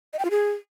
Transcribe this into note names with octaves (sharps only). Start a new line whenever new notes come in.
D#5
G5
F4
G#4